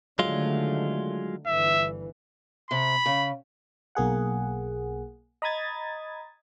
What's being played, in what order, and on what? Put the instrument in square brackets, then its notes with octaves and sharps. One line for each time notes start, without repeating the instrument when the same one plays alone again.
[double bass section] D3 D#3 A3 [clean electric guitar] F#3 G#3 F4
[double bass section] G1 E3 [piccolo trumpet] E5
[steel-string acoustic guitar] C3 [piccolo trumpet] B5
[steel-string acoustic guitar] C#3
[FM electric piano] B1 A#3 G#4 F#5
D#5 A#5 B5 D#6 G#6 A6